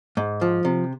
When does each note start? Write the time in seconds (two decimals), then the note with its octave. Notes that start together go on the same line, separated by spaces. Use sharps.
0.17 G#2
0.41 F3
0.65 C3